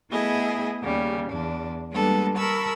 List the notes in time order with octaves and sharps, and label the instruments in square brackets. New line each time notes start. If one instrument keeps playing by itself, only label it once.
[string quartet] A3 B3 E4 G#4 D#5 E5
D#2 C#3 G3
E2 D4
G3 G#3 A#3 B3 D4 A4
A#4 A5 B5 C#6 E6